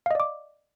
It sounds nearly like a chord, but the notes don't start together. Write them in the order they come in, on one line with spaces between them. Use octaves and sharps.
F5 D#5 D5 D6